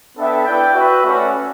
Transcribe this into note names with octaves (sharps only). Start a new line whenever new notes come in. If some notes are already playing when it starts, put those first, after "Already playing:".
B3 D4 A4 E5 G5
E4 B4 D5 G5
F#4 B4 E5
A3 C#4 F#4 B4 D5